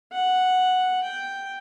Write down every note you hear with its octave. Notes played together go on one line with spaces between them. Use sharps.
F#5
G5